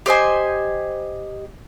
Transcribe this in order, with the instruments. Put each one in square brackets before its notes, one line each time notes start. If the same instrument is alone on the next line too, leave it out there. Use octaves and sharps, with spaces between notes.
[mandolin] G4 C5 D#5 G#5